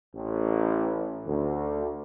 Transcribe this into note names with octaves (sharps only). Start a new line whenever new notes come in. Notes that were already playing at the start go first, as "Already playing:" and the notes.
A1
D2